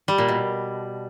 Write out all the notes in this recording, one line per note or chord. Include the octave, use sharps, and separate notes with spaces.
G3
A#2
B2